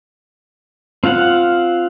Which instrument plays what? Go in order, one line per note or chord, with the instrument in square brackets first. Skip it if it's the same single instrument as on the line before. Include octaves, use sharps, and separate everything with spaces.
[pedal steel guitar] C4 F4 F5 F#5